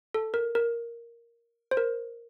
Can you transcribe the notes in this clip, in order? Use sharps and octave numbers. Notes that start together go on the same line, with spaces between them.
A4
A#4
A#4
C5
A#4